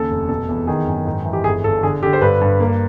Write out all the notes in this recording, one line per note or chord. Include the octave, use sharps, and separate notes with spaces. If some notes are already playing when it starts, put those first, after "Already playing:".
Already playing: D#2 C#3 A4
F1
B2 A4
E2
D#3 G#4
F#2
G#2
E3
G4
G1 G#4
G1 A4
D3 G#4
D3 G4
C5
G2 B4
G2
A#3